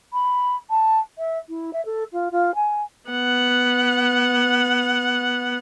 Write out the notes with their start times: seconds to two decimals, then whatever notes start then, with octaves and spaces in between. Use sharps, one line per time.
0.13 B5
0.70 A5
1.18 E5
1.49 E4
1.73 E5
1.85 A4
2.13 F4
2.32 F4
2.55 G#5
3.10 B3 F#5